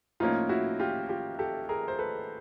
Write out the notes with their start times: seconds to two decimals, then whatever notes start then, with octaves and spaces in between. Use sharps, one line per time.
0.20 A2 F3 A#3 C#4 D#4 F4
0.49 E4 F#4
0.80 F4 G4
1.09 F4 G4
1.39 G4 A4
1.69 G#4 A#4
1.88 C5
1.98 A4 B4